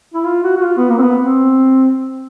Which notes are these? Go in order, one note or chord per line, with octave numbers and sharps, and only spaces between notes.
E4
F4
F#4
F#4
F4
B3
A#3
C4
B3
C4